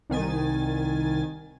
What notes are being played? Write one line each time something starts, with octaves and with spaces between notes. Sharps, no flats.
C2 D#3 G#5 A6